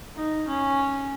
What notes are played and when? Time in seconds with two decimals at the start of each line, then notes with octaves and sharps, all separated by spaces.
0.15 D#4
0.47 C#4